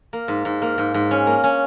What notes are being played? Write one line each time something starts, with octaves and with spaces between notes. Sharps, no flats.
A#3
G#2
G#2
A#3
G#2
G#2
C#4
A#3
C#4